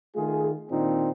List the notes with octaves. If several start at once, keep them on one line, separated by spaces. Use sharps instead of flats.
D#3 A3 F4 G#4
A#2 D#3 C4 D4 D#4 F4